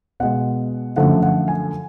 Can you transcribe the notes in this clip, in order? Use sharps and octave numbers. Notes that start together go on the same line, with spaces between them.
B2 G#3 F#5
F#2 D3 F3 A3 F#5
F#5
G#5